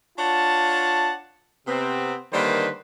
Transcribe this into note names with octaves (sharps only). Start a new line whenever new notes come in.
D4 F4 C#5 F#5 A5
C3 B3 C4
D3 D#3 G3 A#3 B4 C5